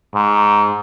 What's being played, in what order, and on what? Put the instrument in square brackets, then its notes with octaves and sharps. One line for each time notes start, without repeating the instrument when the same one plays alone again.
[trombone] G#2